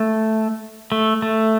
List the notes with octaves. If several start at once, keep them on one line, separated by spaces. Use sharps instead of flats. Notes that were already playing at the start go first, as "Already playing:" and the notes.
Already playing: A3
A3
A3